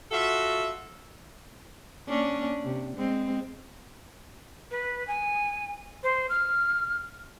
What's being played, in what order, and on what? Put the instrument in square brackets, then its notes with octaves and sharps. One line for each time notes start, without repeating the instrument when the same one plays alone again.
[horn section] F4 F#4 A4 E5
[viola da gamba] A#3 C#4 D4
C3
G#3 C4
[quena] B4
G#5
C5
F6